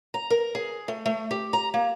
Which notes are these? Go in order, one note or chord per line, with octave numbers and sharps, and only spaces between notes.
A#5
A#4
G#4
A3
A3
G4
A#5
A#3